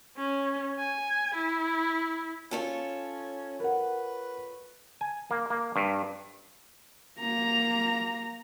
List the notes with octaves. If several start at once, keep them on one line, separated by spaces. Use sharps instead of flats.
C#4
G#5
E4
C#4 F4 A4 C#5
A#4 B4 F#5
G#5
A#3
A#3
G2
A#3 A#5